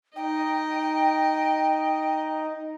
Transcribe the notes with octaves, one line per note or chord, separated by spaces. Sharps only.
D#4 D#5 G5